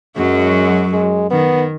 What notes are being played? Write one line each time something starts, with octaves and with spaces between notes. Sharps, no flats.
F#2 F#3 G#3
G#3
D#3 B3